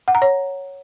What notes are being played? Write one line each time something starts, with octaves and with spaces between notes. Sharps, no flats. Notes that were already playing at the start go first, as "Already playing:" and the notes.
F#5
A#5
C#5